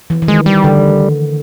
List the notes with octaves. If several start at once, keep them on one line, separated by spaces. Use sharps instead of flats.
E3
E3
D#3 G#3
G3
D3